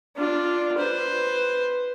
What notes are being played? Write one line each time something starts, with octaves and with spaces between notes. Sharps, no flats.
D4 F4
B4 C5